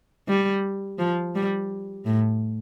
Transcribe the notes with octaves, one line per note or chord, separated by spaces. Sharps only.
G3
F3
G3
A2